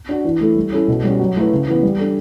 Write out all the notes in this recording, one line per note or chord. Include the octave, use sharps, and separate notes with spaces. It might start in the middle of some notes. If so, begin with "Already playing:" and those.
D4 F#4
E3
A3 E4 A4
G3
C#4 E4 A4
B2
G3 C#4 F#4
F#3
A3 E4 B4
C#3
E3 B3
G3
D4 A4